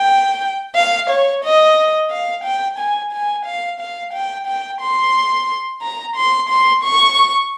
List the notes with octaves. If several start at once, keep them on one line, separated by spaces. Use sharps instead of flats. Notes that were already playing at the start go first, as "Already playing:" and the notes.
Already playing: G5
F5
C#5
D#5
F5
G5
G#5
G#5
F5
F5
G5
G5
C6
A#5
C6
C6
C#6